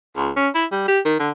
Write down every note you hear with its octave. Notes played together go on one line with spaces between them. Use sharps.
C#2
C#4
E4
G3
G4
D#3
D3